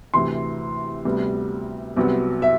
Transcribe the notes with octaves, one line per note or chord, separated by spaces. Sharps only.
D2 C3 E3 C6
D2 C3 G3 B3
C2 C3 F#3 B3
E5